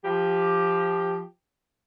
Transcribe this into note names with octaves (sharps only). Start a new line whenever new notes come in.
F3 G4